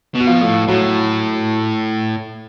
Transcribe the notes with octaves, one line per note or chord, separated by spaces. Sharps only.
B2
F#4
F3 F4
A2
A2 F#3 F#4